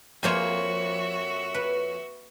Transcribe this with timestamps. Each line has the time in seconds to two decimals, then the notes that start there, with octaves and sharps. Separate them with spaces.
0.23 F2 A#3 F#4 C5 C#5 E5 G#5
1.54 B4